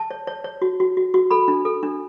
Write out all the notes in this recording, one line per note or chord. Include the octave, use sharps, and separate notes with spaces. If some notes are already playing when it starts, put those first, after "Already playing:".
Already playing: A5
C#5
C#5
C#5
F#4
F#4
F#4
F#4
A4 B5
D4
A4
D4